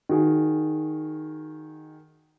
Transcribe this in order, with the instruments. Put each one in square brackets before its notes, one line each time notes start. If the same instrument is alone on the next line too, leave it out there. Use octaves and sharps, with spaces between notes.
[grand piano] D#3 F#4 G#4